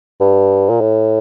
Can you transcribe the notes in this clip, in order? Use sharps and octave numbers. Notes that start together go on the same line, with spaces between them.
G2
A#2
A2